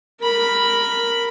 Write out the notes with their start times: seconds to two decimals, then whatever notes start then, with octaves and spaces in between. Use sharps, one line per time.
0.20 A#4 B5